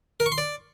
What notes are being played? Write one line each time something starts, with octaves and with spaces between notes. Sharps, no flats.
A#4
C#6
C6
D5